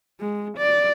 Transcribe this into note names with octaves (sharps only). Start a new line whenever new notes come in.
G#3
D5